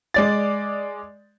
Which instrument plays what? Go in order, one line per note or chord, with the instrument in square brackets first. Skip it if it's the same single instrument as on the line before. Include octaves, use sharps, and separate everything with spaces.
[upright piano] G#3 D5 A6